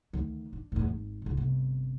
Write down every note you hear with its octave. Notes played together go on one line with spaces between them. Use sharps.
D2 D#3
D4
E2 A2
G#1
C#2 B2
G1 C3